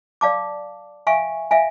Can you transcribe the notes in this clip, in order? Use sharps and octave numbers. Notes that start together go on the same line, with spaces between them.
D5 F5 A5 D6
E5 F5 G#5 C#6
E5 F5 G#5